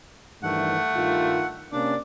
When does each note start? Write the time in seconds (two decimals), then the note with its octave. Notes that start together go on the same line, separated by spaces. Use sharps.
0.43 G2 D#3 E3 A3 F#5
0.95 G2 D#3 F4
1.72 C3 A#3 C#4 D4 D5